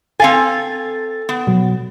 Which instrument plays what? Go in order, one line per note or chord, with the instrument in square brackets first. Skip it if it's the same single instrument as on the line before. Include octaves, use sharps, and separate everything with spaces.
[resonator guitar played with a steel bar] C4 F5 G#5 [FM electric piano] A4 A6
[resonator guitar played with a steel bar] B3
[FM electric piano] B2 F#3